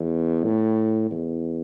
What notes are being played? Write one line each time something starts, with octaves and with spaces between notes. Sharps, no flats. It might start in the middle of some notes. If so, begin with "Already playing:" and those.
Already playing: E2
A2
E2